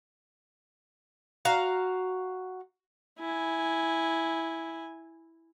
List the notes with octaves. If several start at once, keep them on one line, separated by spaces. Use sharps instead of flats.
F#4 F5 A#5
E4 G#5